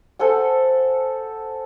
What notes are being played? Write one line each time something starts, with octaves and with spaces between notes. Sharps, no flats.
A4 C5 F#5 G#5